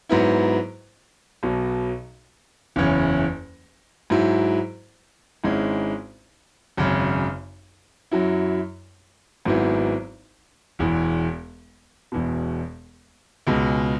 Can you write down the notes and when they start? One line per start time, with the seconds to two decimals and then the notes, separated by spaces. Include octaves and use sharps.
0.09 G#2 F#3 B3 E4
1.43 B1 B2 F#3
2.76 F#1 E2 E3 C#4 E4
4.10 G#2 F#3 E4
5.44 G#1 G#2 G#3 C#4 E4
6.77 G#1 F#2 C#3
8.11 F#2 F#3 E4
9.45 G#1 G#2 F#3 B3 E4
10.79 E1 E2 E3
12.12 E1 E2 B2
13.47 C#2 B2 G#3